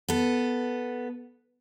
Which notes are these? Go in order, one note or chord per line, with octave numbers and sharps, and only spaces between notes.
B3 A4